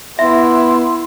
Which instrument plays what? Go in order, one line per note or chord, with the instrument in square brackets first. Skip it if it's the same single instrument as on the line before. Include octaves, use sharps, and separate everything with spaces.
[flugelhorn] B3 [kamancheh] E4 [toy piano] E5 [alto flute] C6